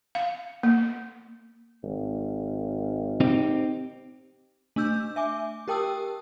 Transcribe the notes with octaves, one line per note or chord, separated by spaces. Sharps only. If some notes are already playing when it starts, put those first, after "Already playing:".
F5
A#3
G#1
C4 D#4 G4
A3 D4 E6 G6
E5 G#5 D6
G4 A#4 G5 A5 D#6 E6